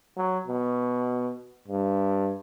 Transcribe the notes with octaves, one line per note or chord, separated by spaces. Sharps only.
F#3
B2
G2